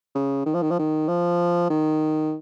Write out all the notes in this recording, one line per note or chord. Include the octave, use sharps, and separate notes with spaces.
C#3
D#3
F3
D#3
F3
D#3
F3
D#3